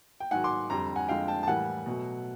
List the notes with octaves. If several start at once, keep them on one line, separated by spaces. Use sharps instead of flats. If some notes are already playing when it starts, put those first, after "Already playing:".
G5
G#2 D#3 F#3 F#5 G#5
C6 D6
F2 D3 G3 A#5 C6
F#5 G#5
F2 D3 F3 G#3 F5 G5
G5 A5
A5
A2 E3 G3 A#3 F#5 G#5
B2 F#3 A3